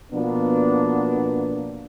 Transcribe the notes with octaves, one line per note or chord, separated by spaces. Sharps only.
B2 F3 A#3 B3 D4